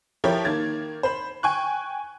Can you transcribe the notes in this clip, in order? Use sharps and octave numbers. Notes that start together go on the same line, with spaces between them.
F3 E4 G4 A#4 C#5
D#3 A#3 G#6 A6
C5 B5
G5 G#5 C#6 F#6